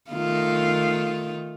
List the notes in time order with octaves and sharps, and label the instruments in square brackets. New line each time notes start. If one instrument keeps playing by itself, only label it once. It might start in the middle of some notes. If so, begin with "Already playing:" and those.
[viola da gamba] D#3 A3 F4